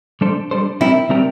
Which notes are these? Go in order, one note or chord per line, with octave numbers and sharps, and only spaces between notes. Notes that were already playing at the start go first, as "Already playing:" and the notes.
G3 D4 A4 C5
G3 D4 A4 C5
G3 C4 E4 G4 A#4
G3 C4 G4 A#4